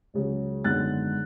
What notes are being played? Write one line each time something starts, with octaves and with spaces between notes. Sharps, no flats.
C#2 C#3 F#3
G#1 F#2 D3 G#3 B3 F#6 A6